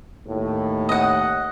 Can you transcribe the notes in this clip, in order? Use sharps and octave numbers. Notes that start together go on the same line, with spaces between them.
D#2 A2
D#5 F#5